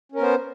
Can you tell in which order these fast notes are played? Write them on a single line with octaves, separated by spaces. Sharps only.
C#4 A#4 B3 C5